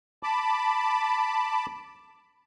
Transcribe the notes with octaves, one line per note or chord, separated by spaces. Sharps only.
A5 B5 D6